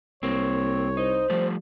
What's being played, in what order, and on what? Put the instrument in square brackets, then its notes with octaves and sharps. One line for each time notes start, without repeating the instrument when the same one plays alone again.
[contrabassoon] C2 [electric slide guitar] A#3 C4 [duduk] C#5
[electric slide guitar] D#4 [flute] C5
[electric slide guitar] F3 G3 A3